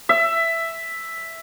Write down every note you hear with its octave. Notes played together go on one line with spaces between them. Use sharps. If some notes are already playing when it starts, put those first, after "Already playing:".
E5